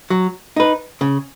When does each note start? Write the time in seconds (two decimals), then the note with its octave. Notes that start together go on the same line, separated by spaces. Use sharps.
0.10 F#3
0.56 D#4 B4
1.01 C#3